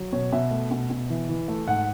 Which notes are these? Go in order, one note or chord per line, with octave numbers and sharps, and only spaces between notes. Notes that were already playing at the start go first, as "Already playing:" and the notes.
Already playing: F#3
B2 C#5
B2 E5
A3
B2
B2
E3
E3
A3
G#2 F#5